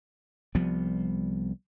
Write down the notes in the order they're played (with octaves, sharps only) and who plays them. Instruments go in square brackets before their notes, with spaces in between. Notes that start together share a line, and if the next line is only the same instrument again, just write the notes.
[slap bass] C2 F3 G3 B3